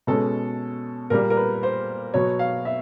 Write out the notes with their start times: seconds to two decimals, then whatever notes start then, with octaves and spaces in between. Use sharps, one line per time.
0.07 B2 G#3 C#4 A4
1.10 A#2 G3 A#3 A#4
1.30 A#4
1.37 B4
1.63 C5
2.14 B2 F#3 B3 C#5
2.39 F5
2.65 E5